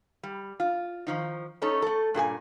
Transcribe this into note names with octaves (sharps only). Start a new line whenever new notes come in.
G3
F4
D#3 F3 D#4
A3 C#4 D#4 A4 C#5
A3 A4
G2 A#2 G#4 G#5